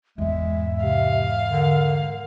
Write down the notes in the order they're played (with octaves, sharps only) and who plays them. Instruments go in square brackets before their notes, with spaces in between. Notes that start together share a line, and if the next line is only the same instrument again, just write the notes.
[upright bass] E2 G#2 [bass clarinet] G#3 [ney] E5
[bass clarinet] C3 [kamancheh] F5
[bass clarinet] D3 [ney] A#4